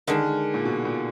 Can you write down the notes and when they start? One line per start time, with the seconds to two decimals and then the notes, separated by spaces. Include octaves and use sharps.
0.07 D3 D#3 G#3 D4
0.54 A#2
0.65 B2
0.85 A#2